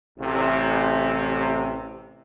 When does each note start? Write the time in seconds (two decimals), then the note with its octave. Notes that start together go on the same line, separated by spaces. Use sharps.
0.19 A1 C3